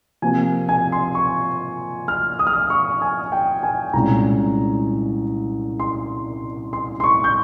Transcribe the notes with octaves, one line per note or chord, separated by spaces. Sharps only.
C3 F3 A#3 G#5
G#5
C6
C#6
F6
D#6
F6
D#6
C#6
G#5
G5
G#5
C2 A#2 G#3 C#4 A#5
C6
C6
C6
C#6
G6